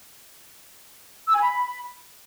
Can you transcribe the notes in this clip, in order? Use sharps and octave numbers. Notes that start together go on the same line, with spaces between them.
E6
G#5
B5